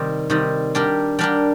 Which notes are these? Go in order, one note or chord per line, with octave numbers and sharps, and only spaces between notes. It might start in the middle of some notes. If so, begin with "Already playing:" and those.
Already playing: C3 D#3 G3
C3 D#3 G3
G3 D4 G4 A#4
G3 D4 G4 A#4